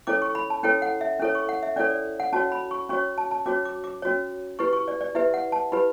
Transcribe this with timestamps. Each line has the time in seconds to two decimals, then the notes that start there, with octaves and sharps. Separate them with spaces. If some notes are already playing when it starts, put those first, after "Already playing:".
0.07 C#4 E4 A4 C#5 D6
0.22 C#6
0.35 B5
0.50 A5
0.63 C#4 E4 A4 C#5 G5
0.82 F#5
1.01 E5
1.20 C#4 E4 A4 C#5
1.35 C#6
1.49 F#5
1.63 E5
1.76 C#4 E4 A4 C#5 D5
1.90 D5
2.20 F#5
2.33 C#4 F#4 C#5 A5
2.52 B5
2.71 C#6
2.89 C#4 F#4 C#5 C#6
3.18 A5
3.31 A5
3.46 C#4 F#4 C#5 D6
3.65 D6
3.84 D6
4.02 C#4 F#4 C#5
4.59 E4 G4 B4 C#6
4.73 C#6
4.88 D5
5.01 D5
5.15 E4 G4 B4 E5
5.34 F#5
5.52 A5
5.72 E4 G4 B4 B5